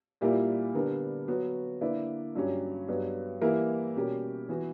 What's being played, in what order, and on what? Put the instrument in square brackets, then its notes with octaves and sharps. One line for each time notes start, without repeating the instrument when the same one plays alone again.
[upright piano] A#2 G3 A#3 E4 A#4
D3 G3 B3 D4 A#4
F#3 B3 F#4
D3 A#3 E4 B4 D5
G2 F#3 C#4 G4
G2 F#3 B3
E3 G3 A#3 E4 A#4
B2 G3 C#4 G4 A#4
E3 B3 F#4